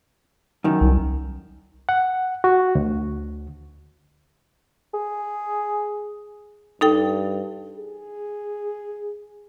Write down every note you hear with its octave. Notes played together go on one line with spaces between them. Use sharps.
F#2 D#3
C2
F#5
F#4
D2
G#4
G2 D#4 A4 G5
G#4